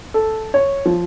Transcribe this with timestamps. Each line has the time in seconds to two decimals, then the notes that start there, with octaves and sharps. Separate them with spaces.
0.14 A4
0.54 C#5
0.86 F3